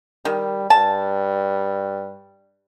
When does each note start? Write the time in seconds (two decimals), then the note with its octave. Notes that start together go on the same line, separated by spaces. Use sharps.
0.25 D#3 G3
0.70 G2 A5